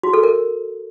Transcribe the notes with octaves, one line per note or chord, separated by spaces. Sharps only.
F#4
A4
A#4